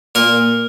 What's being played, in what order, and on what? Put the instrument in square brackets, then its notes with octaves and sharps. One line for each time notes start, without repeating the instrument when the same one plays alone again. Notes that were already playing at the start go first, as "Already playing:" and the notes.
[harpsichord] A#2 A#4